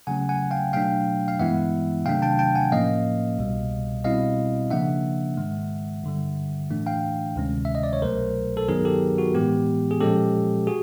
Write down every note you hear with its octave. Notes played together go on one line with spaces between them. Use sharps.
C#3 F#3 A3 C#4 F#5 G#5
F#5 G#5
F5 G5
B2 F#3 A3 D4 F5 G5
F5
G2 E3 G#3 B3 E4 E5 F#5
C3 D#3 F#3 A3 D4 F5 G5
G5 A5
G5 A5
F#5 G#5
A2 F3 A#3 C#4 D#5 F5
C2 B2 G3
B2 G3 C4 E4 D#5 F5
C#3 F3 A#3 D4 E5 F#5
G#2 D#3 G#3
G2 D3 G3
A2 E3 A3 D4
F5 G5
D2 C3 D#3 G#3 C#4
E5
D#5
D5
C#5
C2 B2 F#3 A3 A#4 C5
A4
G2 D#3 F#3 B3 D#4 G#4 A#4
G4 A4
F#4
A2 E3 G#3 B3 G4
G#4
A#2 F3 G#3 C#4 G4 A4
F#4 G#4